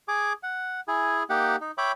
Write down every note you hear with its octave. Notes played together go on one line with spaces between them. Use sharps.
G#4 G#5 D6
F#5
E4 G#4 G#5
A#3 D#4 G4 F#5 G5
D#4
C#5 E5 G5 B5 D6